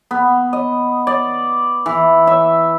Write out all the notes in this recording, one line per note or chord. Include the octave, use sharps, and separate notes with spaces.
B3
D#5
D5
E3
E5